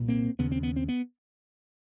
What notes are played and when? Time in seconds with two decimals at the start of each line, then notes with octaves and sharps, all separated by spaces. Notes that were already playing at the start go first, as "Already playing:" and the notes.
Already playing: C2 A#2
0.08 A#3 C4
0.39 D#2 C#3 B3
0.52 C4
0.63 B3
0.76 C4
0.89 B3